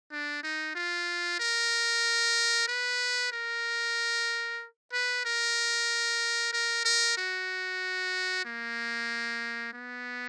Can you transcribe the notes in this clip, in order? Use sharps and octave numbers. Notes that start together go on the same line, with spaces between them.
D4
D#4
F4
A#4
B4
A#4
B4
A#4
A#4
A#4
F#4
A#3
B3